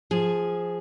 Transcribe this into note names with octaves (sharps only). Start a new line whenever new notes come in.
F3 G#4